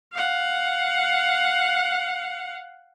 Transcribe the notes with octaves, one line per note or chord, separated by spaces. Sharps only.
F5 F#5